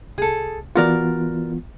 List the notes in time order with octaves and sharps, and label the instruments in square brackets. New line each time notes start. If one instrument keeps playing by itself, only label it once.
[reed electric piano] C2 [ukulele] G#4 A4
[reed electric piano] E3 B3 F4 [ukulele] F#4 A#4 D5